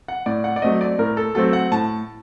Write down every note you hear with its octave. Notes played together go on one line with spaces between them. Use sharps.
F#5
A2 D5
F#5
D5
F#3 A3 C4 D#5
D5
A2 A#4
A4
F#3 A3 C4 A4
F#5
A2 A5